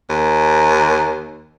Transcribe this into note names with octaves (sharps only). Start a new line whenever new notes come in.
D#2